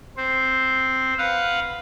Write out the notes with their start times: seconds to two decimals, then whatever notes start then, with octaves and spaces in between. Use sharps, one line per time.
0.17 C4 C5
1.18 B4 F5 F#5